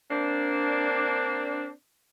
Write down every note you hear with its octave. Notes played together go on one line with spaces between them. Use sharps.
A#3 C4 D4